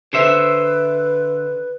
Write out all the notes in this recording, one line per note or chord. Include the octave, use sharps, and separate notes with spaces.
D3 B4 C5 E5